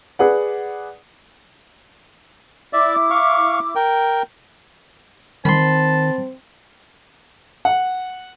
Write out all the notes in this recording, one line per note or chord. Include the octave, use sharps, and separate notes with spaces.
G#4 B4 D5 F#5
E4 D5 E5 D6
F5 C#6
A#4 G5
D#3 C4 A5 B5 C6
F#5